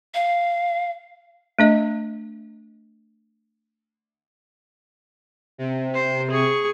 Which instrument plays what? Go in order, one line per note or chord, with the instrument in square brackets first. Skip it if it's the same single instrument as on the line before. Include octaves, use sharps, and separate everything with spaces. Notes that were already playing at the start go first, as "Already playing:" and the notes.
[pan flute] F5
[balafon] A3 D4 D#5
[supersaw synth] C3
[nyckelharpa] C5
G#4 C#6